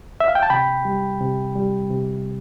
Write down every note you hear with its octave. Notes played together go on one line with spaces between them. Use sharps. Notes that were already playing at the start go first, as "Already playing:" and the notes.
E5
F5
G5
A5
C3 G5 B5
G3
C3
G3
C3